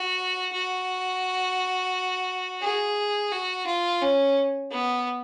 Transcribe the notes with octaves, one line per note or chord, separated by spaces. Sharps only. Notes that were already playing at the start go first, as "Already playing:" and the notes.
Already playing: F#4
F#4
G#4
F#4
F4
C#4
B3